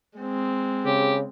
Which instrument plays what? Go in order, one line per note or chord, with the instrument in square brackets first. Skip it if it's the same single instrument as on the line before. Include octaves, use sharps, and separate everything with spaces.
[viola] G#3 C4
[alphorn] C#3 [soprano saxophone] G4